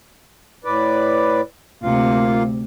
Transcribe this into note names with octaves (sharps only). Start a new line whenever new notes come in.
A2 B4 D5
D2 C3 A#3 F4 F5